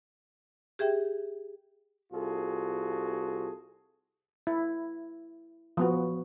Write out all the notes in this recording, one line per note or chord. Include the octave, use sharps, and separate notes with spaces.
G4 G#4 E5 G5
C2 F4 F#4 G#4 A4
E4
F3 B3 F#4